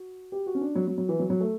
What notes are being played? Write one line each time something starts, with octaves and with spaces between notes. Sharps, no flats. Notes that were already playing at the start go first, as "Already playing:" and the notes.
Already playing: F#4
G4
F#4
C#4
D4
F#3
F#3
F#3
E3
F#3
F#3
A3